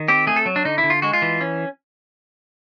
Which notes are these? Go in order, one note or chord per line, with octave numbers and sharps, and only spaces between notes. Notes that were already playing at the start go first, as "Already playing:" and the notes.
Already playing: D#3
C4 G4
A3 G#4
A4
F#3
D4
D3 D#4
E4
D3
F4
G#3 F#4
F4
E3
C#4